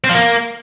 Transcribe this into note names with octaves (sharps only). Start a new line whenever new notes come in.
C4
F3
A#3